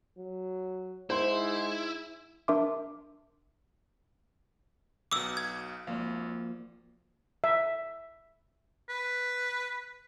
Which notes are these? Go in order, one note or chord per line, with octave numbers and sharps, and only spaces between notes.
F#3
G#2 E4 C5
D4 A#4 E5 C6 D6
B1 B2 D6 E6
F#4 F5 G#6
G#1 F3 A#3 D5 F5
E5
B4